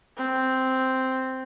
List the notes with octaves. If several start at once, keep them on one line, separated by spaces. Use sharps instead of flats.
C4